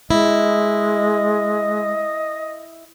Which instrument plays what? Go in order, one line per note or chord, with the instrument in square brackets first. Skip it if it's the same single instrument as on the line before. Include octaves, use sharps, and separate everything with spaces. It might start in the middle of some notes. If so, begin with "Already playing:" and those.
[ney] G#3 [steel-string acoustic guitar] E4 [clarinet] D#5